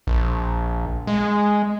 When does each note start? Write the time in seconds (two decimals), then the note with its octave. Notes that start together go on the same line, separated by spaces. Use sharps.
0.07 A#1
1.07 G#3